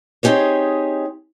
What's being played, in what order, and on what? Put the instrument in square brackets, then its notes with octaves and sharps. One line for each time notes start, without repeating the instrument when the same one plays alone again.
[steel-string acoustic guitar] C4 D#4 G4 G#4 C#5